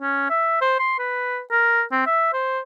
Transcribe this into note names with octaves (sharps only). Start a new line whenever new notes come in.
C#4
E5
C5
C6
B4
A#4
C4
E5
C5